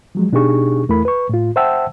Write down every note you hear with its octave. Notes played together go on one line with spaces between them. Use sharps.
F3 F#3 G#3
B2 D4 D#4 G4 G#4 C#6
E2 A3 E4 A#4 B5
B4 C#6
A2 F4
C5 E5 F#5 G5 A5 E6